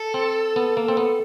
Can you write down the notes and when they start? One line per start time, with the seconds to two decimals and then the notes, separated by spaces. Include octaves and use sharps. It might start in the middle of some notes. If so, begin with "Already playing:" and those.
Already playing: A4
0.14 C4
0.56 B3
0.77 A#3
0.88 C4
0.97 B3